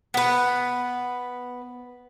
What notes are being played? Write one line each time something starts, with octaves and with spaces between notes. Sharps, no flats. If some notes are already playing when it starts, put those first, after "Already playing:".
B3 B4